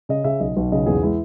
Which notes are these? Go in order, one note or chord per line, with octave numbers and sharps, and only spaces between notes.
C#3 D#5
C#3 E5
B1 D#5
B1
C#3 D#5
E2 G#4
G#3 E4